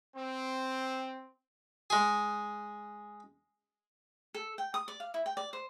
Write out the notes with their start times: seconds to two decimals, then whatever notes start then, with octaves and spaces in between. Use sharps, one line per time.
0.15 C4
1.90 G#3 G#4
4.34 A4
4.58 G5
4.74 D#6
4.88 D5
5.00 F5
5.14 E4
5.26 G5
5.37 D5
5.53 C5